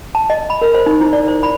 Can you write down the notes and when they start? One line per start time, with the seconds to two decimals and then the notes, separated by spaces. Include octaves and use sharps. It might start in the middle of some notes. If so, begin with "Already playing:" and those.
0.15 A5
0.30 D#5
0.50 B5
0.62 A#4
0.75 C5
0.86 D#4
1.01 E4
1.13 D5
1.28 C5
1.43 B5